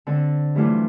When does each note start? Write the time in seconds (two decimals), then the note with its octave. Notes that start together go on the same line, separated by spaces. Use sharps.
0.07 D3 C4
0.55 G2 E3 F#3 A3 D4 F4